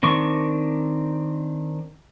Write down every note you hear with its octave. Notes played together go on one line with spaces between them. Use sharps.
D#3 C4 D4 C#6